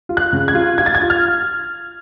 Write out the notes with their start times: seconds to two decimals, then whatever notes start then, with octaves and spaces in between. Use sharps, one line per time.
0.09 F4
0.17 F#6
0.33 C#3
0.48 G#6
0.55 F4
0.78 F4 G#6
0.86 A6
0.95 G#6
1.02 F4
1.10 F6